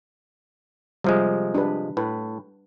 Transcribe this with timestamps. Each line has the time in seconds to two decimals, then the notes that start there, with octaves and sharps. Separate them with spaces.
1.04 C3 F3 G3 G#3 E5 F5
1.54 D4 G4 B4
1.97 A2 B4